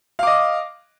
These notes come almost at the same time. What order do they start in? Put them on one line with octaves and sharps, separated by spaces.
F5 D6 D#5